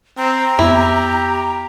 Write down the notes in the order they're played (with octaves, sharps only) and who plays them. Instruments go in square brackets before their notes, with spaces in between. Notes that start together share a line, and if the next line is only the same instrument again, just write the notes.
[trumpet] C4 [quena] A#5
[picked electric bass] F2 B3 [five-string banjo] E4 [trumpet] G4